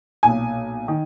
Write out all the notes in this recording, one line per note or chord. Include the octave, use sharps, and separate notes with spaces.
B1 A#2 G#5
D#3